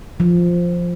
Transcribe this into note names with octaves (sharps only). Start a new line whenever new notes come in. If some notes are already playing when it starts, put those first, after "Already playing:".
F3